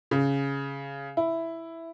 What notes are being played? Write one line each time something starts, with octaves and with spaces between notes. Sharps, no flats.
C#3
E4